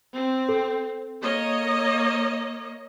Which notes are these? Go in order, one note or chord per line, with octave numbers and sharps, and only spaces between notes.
C4
A4
A#3 C#5 D#5